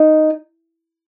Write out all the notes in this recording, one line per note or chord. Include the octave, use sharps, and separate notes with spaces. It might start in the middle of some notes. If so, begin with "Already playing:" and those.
Already playing: D#4